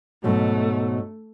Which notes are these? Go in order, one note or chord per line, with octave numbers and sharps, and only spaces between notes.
G#2 B2 F#3 A3